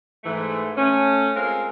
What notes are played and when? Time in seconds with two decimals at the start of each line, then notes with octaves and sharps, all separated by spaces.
0.24 G#2 E3 A3
0.76 A3 C#4
1.35 G#3 C4 F4 A#4